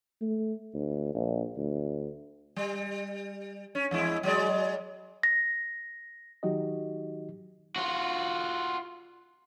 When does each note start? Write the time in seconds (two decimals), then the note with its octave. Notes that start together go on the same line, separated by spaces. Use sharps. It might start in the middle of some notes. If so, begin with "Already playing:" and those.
0.21 A3
0.74 D2
1.14 A#1
1.57 D2
2.56 G3
3.75 C#4
3.91 E2 G#3 E4
4.23 F#3 G#3 D5
5.23 A#6
6.43 D#3 F#3 D#4 F#4 G4 D#5
7.76 F4 F#4